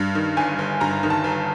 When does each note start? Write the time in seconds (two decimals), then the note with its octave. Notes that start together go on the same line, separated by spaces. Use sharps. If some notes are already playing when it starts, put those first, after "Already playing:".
Already playing: G2
0.15 D#3
0.37 G1 G#5
0.59 G1
0.81 G2 A#5
1.03 D#3
1.10 A5
1.24 G1